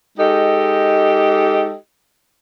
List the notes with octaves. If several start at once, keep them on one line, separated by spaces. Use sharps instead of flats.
G#3 D#4 G4 A4 D#5